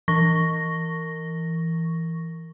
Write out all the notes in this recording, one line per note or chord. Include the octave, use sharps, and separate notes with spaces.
E3 C#6 A#6